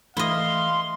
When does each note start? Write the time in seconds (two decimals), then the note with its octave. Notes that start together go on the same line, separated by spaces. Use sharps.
0.17 E3 A3 E4 D#5 F5 C6